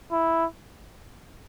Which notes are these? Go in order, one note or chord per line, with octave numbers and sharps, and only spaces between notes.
E4